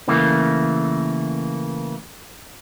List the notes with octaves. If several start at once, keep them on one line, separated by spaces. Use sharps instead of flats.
C#3 E3 A3 A#3